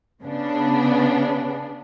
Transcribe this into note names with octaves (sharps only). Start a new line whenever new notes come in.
C#3 B3 D4